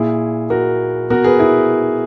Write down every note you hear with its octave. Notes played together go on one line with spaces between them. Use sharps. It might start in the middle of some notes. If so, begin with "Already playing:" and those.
Already playing: A#2 E4 G#4
F#4 A#4
B2 F#4 A#4
G#4 B4
E4 G#4